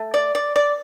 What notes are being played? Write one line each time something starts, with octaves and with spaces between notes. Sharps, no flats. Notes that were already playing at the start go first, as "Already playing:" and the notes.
Already playing: A3
D5
D5
D5